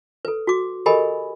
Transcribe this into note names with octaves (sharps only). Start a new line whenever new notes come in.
A4 B4
F#4 D6
G4 A4 A#4 D#5 G#5 B5